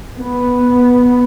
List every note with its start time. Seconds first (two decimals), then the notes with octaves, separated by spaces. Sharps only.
0.18 B3